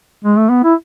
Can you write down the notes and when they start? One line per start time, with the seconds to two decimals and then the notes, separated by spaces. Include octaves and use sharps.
0.25 G#3
0.38 A3
0.50 B3
0.64 E4